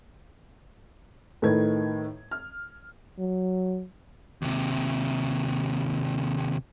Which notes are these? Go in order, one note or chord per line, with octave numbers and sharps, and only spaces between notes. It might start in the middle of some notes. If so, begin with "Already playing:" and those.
A2 D#3 A3 B4 G#6
F6
F#3
D#2 C3